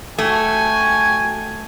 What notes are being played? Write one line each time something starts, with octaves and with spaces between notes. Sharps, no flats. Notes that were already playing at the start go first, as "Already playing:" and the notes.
A3 F#4 G5 G#5